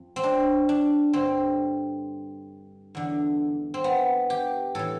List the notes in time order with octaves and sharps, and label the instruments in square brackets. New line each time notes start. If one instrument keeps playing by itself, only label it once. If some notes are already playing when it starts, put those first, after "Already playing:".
Already playing: [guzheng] F2
C4
D4
D4
G2 D3 C4
E2 D3
C4
B3
G4
A2 E3 A4